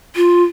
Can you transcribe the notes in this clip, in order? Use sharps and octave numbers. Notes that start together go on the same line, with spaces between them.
F4